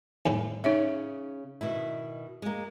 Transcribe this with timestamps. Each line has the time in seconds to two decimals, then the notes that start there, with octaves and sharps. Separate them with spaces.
0.26 D#2 A2 G3 G#5
0.64 C#3 C#4 D#4 C#5 E5
1.61 B2 D#3 E4
2.42 G#3 A#3